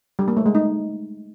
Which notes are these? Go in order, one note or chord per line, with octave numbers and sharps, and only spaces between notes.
G3
A#3
A3
G#3
D#4